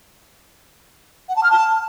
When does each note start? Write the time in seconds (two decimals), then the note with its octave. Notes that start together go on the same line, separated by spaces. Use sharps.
1.28 F#5
1.36 A5
1.43 F6
1.50 A5